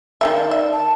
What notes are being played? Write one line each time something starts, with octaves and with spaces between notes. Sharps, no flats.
D#3 C4 E5 F5
D5
E5
A5